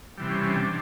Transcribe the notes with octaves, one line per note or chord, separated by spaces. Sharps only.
C3 E3 G3
C#4
C#4
D4
C3